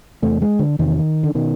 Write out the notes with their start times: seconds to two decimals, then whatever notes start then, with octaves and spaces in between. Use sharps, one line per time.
0.22 E2 C3 A3
0.42 G#3
0.59 D3
0.79 E2 C3 D#3
1.23 D3
1.35 B2 D#3